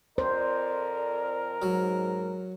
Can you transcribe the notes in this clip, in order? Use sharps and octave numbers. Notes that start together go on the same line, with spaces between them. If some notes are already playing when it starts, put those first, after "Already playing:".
F2 A#4 C5 D5
G#2 F#3